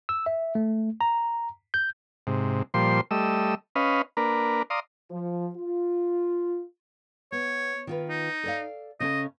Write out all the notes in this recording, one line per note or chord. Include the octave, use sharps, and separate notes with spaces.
E6
E5
A3
A#5
G6
G#2 C3
A#2 F3 G3 C5 C6
G3 A3 D#5 E6
C#4 B4 D#5 F5
A#3 D4 A#4 B4
D5 F5 A#5 C6 D#6
F3
F4
B3 C#5
D#3 F4 B4
D#4
A4 D5 F5
C#3 C#4 A4 D#5